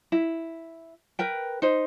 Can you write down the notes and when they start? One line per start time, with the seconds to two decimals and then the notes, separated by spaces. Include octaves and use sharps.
0.12 E4
1.19 A#4 B4 G5
1.62 D#4 C5